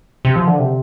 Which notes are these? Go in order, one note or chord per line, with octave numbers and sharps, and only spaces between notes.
C3
F3
D3
C3